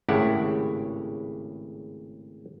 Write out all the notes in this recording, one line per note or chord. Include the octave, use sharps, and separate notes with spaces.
G#1 A2 C#3 E4 G4 F#5